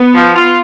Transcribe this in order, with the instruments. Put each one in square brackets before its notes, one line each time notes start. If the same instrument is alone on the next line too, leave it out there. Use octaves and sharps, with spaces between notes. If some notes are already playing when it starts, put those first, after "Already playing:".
Already playing: [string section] B3
[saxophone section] F3
F4